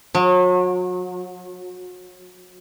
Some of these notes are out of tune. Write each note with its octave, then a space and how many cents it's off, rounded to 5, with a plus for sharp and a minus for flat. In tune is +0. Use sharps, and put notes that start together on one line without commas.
F#3 -35